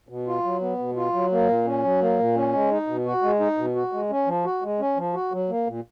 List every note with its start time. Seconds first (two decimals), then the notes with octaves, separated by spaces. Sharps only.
0.09 B2
0.27 F4
0.44 F#3
0.61 B3
0.79 B2
0.96 F4
1.13 F#3
1.32 A#3
1.48 A#2
1.65 C#4
1.84 F#3
2.01 A#3
2.19 A#2
2.35 C#4
2.52 G#3
2.71 D#4
2.87 B2
3.05 F#4
3.22 G#3
3.40 D#4
3.57 B2
3.75 F#4
3.92 G#3
4.10 C#4
4.26 F3
4.45 F#4
4.62 G#3
4.79 C#4
4.97 F3
5.14 F#4
5.32 F#3
5.50 A#3
5.67 A#2